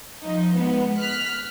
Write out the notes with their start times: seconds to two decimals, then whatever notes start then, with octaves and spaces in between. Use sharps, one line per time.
0.22 F3 D#4
0.54 G#3 B3
0.98 F6 F#6 B6